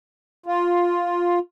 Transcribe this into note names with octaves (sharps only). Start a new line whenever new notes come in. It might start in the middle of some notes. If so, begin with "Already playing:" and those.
F4